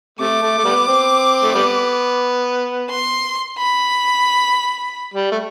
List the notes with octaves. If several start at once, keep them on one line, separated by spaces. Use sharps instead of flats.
C3 A3 D6
A3
A3
G3 B3
C4
A3
G3 B3
C6
B5
G3
A3